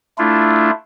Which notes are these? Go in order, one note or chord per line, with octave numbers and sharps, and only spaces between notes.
A3 D4 E4 F4